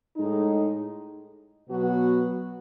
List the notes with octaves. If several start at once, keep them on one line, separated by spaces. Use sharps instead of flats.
A2 G#3 D#4
B2 F#3 B3 F#4